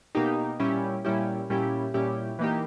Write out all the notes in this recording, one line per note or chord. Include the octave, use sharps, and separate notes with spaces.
B2 A#3 D#4 G4
A#2 G3 C#4 E4 G4
A#2 G3 C#4 E4 G4
A#2 G3 C#4 E4 G4
A#2 G3 C#4 E4 G4
E3 A#3 D#4 G4